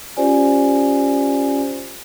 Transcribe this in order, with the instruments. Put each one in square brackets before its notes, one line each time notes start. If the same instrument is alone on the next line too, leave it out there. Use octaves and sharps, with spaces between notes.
[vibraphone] C#4 F4 G4 C5 D5 G#5